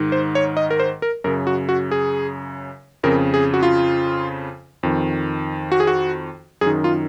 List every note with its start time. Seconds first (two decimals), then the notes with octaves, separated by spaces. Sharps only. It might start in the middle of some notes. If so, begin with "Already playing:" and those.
Already playing: G#2 D#3
0.12 C5
0.35 C#5
0.57 D#5
0.71 A#4
0.80 C5
1.02 A#4
1.24 F#2 C#3 A#4
1.47 F#4
1.69 F#4
1.91 G#4
3.03 F2 C#3 A#4
3.34 G#4
3.54 F#4
3.63 F4
4.83 F2 D#3
5.72 F#4
5.80 G#4
5.87 F#4
6.61 F#2 G#4
6.66 D#3
6.84 F4